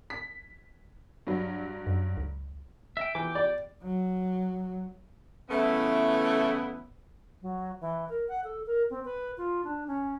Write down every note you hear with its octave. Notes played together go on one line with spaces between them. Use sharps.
B6
G2 F#3
F#2
C#2
E5 G5
E3 G5 D6
D5
F#3
C#3 E3 A3 B3 E4
F#3
E3
A#4
F#5
A4
A#4
C4
B4
F4
D4
C#4